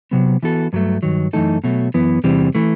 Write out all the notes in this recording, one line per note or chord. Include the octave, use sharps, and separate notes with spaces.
C3 F#3 B3
E3 B3 F#4 A4
G2 F#3 A3
G2 D#3 F#3
F#2 E3 A3 D#4 A4
B2 F#3 A3
F#2 E3 B3
E2 C3 E3 G3 C4
E3 A3